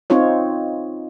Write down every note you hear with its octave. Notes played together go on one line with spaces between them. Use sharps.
C4 D#4 F4 C#5